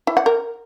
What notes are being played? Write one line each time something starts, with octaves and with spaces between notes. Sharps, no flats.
E4
F#5
A#4